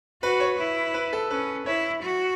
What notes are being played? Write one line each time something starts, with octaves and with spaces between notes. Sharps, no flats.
F#4 B4
C#5
E4
B4
A4
C#4 B4
E4 C#5
F#4